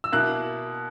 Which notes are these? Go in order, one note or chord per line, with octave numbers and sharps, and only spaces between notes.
E6
B2 A#3 E4 F#6